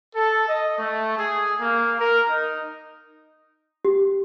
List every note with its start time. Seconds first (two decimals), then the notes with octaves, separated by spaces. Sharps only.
0.15 A4
0.49 D#5
0.79 A3
1.18 G#4
1.61 A#3
2.00 A#4
2.29 D#4
3.85 G4